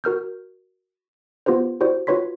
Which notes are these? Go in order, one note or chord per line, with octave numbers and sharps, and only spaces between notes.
F#4 A#4 F6 G6
B3 F4 G4 B4 C5
E4 F#4 G4 C5 D5
F4 F#4 B4 C#5 C6 B6